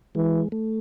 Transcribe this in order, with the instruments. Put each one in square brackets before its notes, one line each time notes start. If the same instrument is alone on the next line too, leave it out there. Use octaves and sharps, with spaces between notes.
[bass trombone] E3 [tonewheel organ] G#3
[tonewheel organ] A3